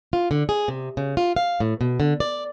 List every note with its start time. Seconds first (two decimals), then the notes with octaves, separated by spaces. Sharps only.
0.13 F4
0.31 D3
0.49 G#4
0.68 C3
0.97 C#3
1.17 F4
1.36 F5
1.60 A2
1.81 B2
2.00 D3
2.20 D5